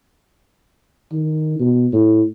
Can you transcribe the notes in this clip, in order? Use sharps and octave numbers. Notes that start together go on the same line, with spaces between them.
D#3
B2
A2